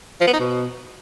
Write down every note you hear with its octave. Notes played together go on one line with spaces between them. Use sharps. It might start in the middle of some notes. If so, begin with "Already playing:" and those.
F3
B3
D#4
B2